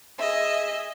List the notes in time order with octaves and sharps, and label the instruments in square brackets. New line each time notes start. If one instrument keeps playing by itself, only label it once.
[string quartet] G#4 D#5 E5